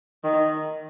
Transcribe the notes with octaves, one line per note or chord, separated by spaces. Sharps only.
D#3